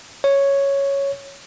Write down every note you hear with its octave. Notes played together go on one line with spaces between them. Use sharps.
C#5